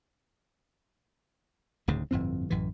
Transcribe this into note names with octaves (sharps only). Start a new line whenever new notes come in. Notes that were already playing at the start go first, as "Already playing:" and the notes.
D1 D2 G#2 C#3
G1 F2 A2 C4
A1 F#2 E3